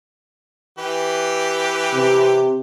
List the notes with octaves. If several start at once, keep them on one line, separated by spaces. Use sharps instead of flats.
E3 G4 B4
C3